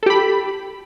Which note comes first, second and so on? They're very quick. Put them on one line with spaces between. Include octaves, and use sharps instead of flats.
A4 G4 B5